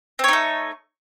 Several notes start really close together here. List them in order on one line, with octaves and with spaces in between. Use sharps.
C4 C#5 D#4 A3